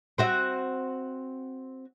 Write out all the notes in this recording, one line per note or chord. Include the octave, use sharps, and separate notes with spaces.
C4 F#4 E5